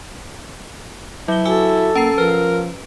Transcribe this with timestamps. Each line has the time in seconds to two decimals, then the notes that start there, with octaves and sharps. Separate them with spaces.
1.28 F#3 E4 G7
1.45 F#4 A4 G#5 D6 E6
1.95 A#3 C#4 A#5 C7
2.18 F3 A#4 B4